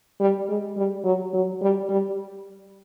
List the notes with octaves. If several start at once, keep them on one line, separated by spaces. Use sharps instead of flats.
G3
G#3
G3
F#3
F#3
G3
G3